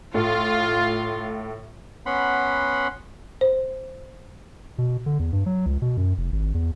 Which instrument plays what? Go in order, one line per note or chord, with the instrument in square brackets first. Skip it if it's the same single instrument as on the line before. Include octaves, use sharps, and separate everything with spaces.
[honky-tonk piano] A2 [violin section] F4
[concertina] B3 C#4 F#5 B5 C6
[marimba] C5
[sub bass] B2
D3
E2
G2
F#3
C#2
B2
F#2
F1
G#1
E2